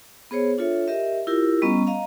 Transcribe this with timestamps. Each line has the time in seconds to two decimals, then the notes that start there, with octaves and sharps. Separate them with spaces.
0.31 B3 G#4 C5 C#5
0.58 D4 F4 A4 C#5 E5
0.88 G4 A#4 D#5 E5
1.27 E4 F4 G4 A#4
1.62 G3 B3 C#4 D#5 A#5 C#6
1.87 D#5 F5 A#5